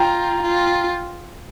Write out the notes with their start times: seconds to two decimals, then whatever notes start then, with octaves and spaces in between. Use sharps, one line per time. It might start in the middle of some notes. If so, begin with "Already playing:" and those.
Already playing: F4 G5 A#5
0.43 F4